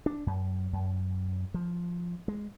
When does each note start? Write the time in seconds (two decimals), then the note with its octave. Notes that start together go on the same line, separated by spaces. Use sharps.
0.06 D4
0.27 F#2
0.73 F#2
1.54 F3
2.28 G#3